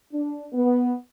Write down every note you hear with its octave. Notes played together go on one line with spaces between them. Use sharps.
D4
B3